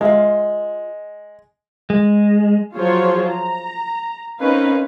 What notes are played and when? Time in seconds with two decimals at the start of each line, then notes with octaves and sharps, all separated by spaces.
0.01 G#3 F4 E5 F5
1.90 G#3
2.76 F3 F#3 F4 G#4 C5 C#5
3.30 A#5
4.40 C4 C#4 D#4 A#4 B4 F5